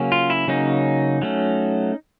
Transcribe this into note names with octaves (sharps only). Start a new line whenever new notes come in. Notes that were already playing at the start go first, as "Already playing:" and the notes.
Already playing: C#3 F#3 A#3 C#4
F4
E4
C#3 F#3 A#3 C#4 D#4
F#3 A3 C#4